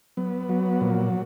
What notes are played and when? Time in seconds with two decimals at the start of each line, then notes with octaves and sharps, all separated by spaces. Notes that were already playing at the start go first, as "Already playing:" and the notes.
0.17 F#3 B3
0.49 F#3
0.81 A#2 F3